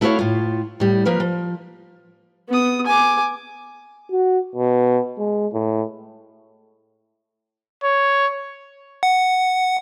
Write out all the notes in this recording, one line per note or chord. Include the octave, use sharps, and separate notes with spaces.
A3 E4 F#4 A4 C#5 F5
A2 F4
A2 G3
F3 A#3 B4 F5
F3
B3 D#6
G#5 D6
F#4
B2
G#3
A2
C#5
F#5